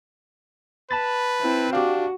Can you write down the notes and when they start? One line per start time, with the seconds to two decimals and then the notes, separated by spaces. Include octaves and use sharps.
0.91 B4 A5 B5 A6
1.41 C4 E4
1.73 D4 F#4 G4 F5